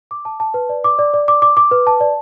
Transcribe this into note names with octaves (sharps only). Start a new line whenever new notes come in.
D6
A5
A5
B4
D5
D6
D5
D5
D6
D6
D6
B4
A5
D5